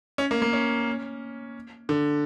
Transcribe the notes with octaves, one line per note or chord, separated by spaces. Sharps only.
C#4
A#3
A#3
C#4
D3